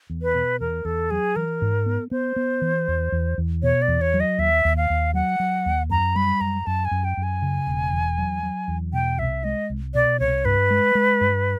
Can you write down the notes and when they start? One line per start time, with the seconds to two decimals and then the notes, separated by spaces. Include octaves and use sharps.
0.10 E2
0.22 B4
0.35 B2
0.60 E2 A#4
0.85 E2 A4
1.11 F#3 G#4
1.36 E3 A#4
1.62 G#2
1.86 B3
2.11 B3 C5
2.36 B3
2.62 E3
2.88 E2
3.12 E2
3.38 E2
3.63 B2 C#5
3.82 D5
3.88 E2
4.01 C#5
4.14 F#3
4.20 D#5
4.38 D#2 E5
4.65 D#2
4.77 F5
4.90 D#2
5.14 F#3 F#5
5.40 F#3
5.66 D#2
5.90 F#2 A#5
6.16 G3 B5
6.41 F#2 A#5
6.66 F#2 A5
6.85 G#5
6.91 F#2
7.04 G5
7.17 F#2
7.23 G#5
7.42 C#3
7.67 E1
7.92 E2
8.18 F#3
8.43 F#3
8.68 E2
8.93 B2 G5
9.19 C2 E5
9.44 G#3 D#5
9.70 C2
9.94 B2 D5
10.20 C2 C#5
10.45 G2 B4
10.70 G#3
10.95 G#3
11.21 G2